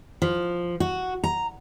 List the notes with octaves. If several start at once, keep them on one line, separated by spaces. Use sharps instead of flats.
F3
F#4
A#5